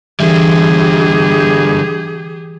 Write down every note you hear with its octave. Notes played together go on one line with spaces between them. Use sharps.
D3 E3 G3 G4 G#4